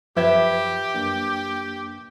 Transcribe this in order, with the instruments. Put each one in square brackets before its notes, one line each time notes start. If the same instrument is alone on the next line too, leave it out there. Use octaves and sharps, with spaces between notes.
[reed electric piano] F#2 F3 [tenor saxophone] G4 [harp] B4 G#6 B6 [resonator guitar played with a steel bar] E5
[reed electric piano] F#2 A#3 D4